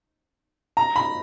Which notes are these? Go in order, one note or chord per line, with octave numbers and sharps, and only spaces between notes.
A#5
B5